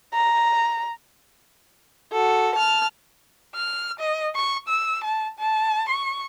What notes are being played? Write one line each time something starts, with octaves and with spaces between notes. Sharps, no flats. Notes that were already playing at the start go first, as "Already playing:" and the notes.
A#5
F#4 A4
A5 F6
F6
D#5
C#6
E6
A5
A5
C#6